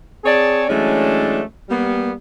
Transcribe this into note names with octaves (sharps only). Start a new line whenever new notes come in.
C4 G#4 C#5 D5 G#5 A5
E3 F#3 G#3 A3 C#4 D4
G3 A#3 B3